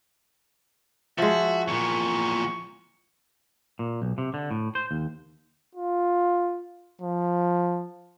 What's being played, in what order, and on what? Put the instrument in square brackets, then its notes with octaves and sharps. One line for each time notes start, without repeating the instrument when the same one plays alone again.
[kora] F3 G#3 [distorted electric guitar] F#4 [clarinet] E5
[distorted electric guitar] E2 A#2 [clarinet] C#6
[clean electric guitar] A#2
B1
C3
D3
A2
C5
D#2
[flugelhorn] F4
F3